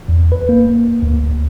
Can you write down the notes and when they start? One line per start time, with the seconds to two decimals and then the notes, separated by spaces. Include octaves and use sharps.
0.08 E2
0.32 B4
0.49 A#3
1.02 D2